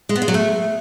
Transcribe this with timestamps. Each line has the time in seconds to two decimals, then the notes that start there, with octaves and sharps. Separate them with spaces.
0.09 G#3
0.16 B3
0.22 G#3
0.28 F#3
0.34 A3